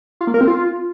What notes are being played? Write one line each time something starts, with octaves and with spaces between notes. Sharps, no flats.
F4
A#3
A#4
C4
F4